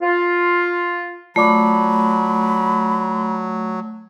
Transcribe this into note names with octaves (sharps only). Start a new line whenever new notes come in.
F4
F#3 A3 F4 D5 B5 D6